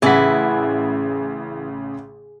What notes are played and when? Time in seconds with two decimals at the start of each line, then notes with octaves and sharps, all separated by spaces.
0.02 A1 C#3 E3 E4 G#4 F#5 B6